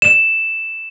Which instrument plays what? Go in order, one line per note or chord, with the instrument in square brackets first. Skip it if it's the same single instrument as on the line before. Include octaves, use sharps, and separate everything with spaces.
[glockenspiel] E7